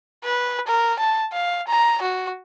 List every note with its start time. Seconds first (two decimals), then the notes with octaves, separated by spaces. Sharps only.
0.24 B4
0.68 A#4
0.99 A5
1.33 F5
1.68 A#5
2.02 F#4